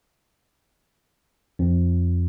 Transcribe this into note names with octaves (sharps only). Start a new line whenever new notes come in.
F2